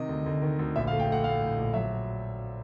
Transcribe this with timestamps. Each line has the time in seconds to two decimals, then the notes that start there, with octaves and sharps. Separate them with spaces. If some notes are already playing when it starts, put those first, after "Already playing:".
Already playing: C3 D#3 D#5
0.09 D2
0.26 D2
0.42 D#3
0.59 D2
0.75 A#1 E5
0.87 F5
0.91 A3
1.00 G5
1.08 A3 F#5
1.24 A3 F5
1.41 A2
1.57 A#1
1.74 F#3 E5